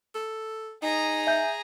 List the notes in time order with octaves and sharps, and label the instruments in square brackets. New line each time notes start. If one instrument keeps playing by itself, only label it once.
[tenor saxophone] A4
[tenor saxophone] D#4 [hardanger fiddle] G#4 A#5
[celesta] E5 G#5 G6